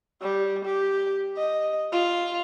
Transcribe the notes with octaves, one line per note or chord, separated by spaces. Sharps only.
G3
G4
D#5
F4